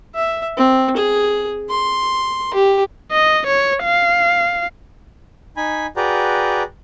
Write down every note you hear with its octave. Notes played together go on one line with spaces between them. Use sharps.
E5
C4
G#4
C6
G4
D#5
C#5
F5
D#4 G#5 B5
F#4 G#4 B4 D5 G5 A#5